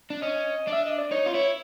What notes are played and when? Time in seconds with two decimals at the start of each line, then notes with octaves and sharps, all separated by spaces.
0.10 D4
0.22 C#4 D#5
0.68 D4 E5
0.85 D#5
0.98 D5
1.11 D#4 C#5
1.26 F4
1.34 E4 C#5